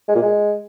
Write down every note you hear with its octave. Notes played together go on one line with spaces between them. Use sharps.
G#3
A#2
G#3